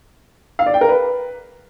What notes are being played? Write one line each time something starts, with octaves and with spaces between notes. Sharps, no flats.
F5
D5
G5
A#4
B4